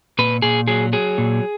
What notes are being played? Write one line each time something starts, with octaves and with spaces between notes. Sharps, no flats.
A#2 B4
A#2 G#4
F#3 G#4
F#3 G#4
A#2